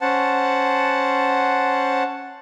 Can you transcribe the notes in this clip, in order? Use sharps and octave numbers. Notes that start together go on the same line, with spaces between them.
C#4 C5 F#5 A5